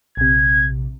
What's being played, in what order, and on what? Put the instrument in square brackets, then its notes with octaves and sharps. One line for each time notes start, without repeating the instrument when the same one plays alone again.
[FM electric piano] A#1 C3 [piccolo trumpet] G#6